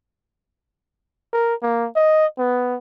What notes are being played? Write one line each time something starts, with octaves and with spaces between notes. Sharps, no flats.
A#4
A#3
D#5
B3